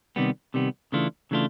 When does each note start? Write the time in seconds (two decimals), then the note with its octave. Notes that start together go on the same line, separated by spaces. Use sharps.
0.16 C3 D#3 G3 B3
0.54 C3 D#3 G3 B3
0.92 C#3 E3 A3 D4 F4
1.31 C#3 E3 A3 D4 F4